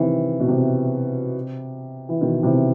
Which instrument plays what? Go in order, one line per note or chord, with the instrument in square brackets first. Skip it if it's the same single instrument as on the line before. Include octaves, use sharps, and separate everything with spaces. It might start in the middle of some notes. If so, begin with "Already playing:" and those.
Already playing: [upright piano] C3 D#3 E3
B2
C3
E3
B2 D#3
C3 E3